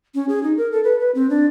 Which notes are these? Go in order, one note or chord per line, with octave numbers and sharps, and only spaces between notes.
C#4
G#4
D#4
A#4
A4
B4
B4
C4
D4